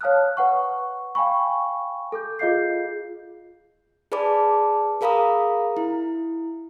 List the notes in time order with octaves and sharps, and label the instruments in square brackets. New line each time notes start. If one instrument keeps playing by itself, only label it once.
[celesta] C#5 F5 A5 D#6 F6 F#6
B4 F#5 C#6
F5 G5 G#5 B5 C#6
A4 D6 G6
F4 G#4 D#5 F5 G6 C7
[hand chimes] G#4 B4 D5 A5 B5 D6
G#4 A#4 F5 A#5 B5 D#6
E4